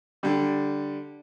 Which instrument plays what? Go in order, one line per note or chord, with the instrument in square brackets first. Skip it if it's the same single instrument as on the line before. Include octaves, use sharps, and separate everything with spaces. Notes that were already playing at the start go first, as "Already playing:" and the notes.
[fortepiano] D3 G3